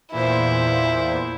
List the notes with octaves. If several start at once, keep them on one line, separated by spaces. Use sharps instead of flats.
E2 A#2 E4 C5